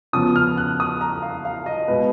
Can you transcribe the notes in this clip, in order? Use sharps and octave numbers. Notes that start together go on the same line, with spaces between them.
C#3 F3 B3 D#6
F6
F#6
D#6
A#5
F5
F5
D#5
B2 G#3 B3 B4